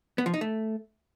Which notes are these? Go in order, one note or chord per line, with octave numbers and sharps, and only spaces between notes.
B3
F3
D#4
A3